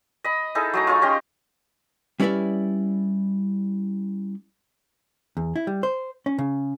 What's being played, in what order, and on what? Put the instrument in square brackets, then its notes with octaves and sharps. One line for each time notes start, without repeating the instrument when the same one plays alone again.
[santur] D#5 B5
D#4 E4 G#4 A4
F#3 A3 A#5
F4 G#4 C#5 F5
C#4 G4 D#5 C6
[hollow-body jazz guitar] G3 C#4 E4 B4 D5 E5
E2
E4
G3
C5
C#4
C#3